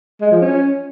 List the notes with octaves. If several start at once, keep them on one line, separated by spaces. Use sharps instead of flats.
G#3
F3
C#4